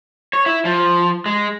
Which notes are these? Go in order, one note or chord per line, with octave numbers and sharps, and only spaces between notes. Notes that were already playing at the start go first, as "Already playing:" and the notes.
C#5
E4
F3
G#3